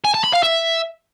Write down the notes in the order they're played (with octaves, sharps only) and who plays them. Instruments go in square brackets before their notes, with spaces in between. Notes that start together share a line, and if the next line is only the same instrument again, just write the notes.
[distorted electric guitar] G#5
A5
B5
F5
E5